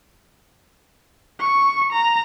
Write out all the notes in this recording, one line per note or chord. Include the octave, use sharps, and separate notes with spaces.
C#6
A#5